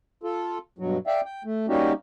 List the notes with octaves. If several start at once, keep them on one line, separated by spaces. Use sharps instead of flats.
F4 A4
G2 B2 F#3
D5 E5 F5 G5
G5
A3
G3 A#3 C#4 D#4 F#4 G4